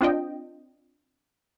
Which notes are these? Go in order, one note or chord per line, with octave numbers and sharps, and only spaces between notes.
C4 D4 F4 D#5 G5